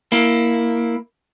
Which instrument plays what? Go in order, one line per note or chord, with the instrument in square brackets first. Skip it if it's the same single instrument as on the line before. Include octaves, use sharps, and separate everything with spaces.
[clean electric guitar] A#3 E4